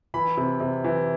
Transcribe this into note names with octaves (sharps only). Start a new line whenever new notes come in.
E3 B5
C3
C3
E3